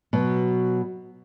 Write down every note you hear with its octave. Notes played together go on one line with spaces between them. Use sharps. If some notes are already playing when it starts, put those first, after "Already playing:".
B2 F#3